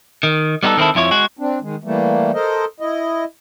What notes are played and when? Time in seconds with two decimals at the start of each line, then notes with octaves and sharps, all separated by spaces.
0.23 D#3
0.63 G3 B3 D#4 F#4 A4
0.77 D#3 C4 D4 E4 A4
0.95 F2 F3 E4 C#5
1.11 G#3 F#4
1.39 C4 D4
1.61 D#3 G#3
1.84 E3 G3 A3 A#3
2.34 A4 A#4 C5 D#5
2.80 E4 D#5